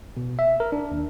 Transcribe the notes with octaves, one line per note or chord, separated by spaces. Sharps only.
B2
E5
A#4
D4
D#2